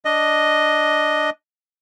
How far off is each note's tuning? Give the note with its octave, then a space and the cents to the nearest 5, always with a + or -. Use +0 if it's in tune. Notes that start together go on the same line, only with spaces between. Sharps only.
D4 +0 D#5 +0